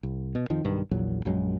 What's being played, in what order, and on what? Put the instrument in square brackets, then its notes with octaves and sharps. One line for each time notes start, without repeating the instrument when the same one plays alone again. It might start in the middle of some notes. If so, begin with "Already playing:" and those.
[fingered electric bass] C2
B2
F2 D#3 F3
B1 G2 D#3
A#1 E2 A#2 F#3
A#1 F#2 F#3 G#3